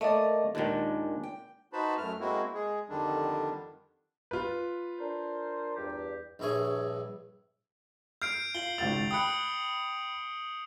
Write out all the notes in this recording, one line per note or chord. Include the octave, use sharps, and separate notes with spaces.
A3 A#3 A#4 D5 D#5
D#2 A#2 D#3 G#3 D4
G5
D#4 F#4 B4 C5 A5 B5
F#2 A3 F6
G#3 A#3 C4 E4 F#4
G#3 G#4
F2 D3 D#3 G3 D4
F4 B4
D4 A#4 C5
E2 G2 G4
A#1 G2 E4 G#4 C#5
F6 G6 C7 D7
F4 C7 F#7 G7
G#1 C#2 A6 F7
G5 B5 D#6 F#6 C#7